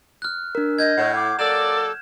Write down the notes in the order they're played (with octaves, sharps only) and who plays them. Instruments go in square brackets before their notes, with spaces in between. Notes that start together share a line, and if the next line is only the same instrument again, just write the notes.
[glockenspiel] F6 F#6
[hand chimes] D4 A#4
[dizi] D#5 [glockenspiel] G6 G#6
[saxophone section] A2 [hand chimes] F#5
[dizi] D6
[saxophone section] F#3 A#3 D5 [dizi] A4 [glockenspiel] E7